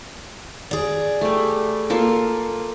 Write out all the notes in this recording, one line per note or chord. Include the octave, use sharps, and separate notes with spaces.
G#4 D5
G3 A3
A#3 F4 A4